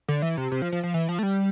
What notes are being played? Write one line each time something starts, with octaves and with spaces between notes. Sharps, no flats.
D3
E3
C3
C3
F3
F3
F3
E3
F3
A3
G3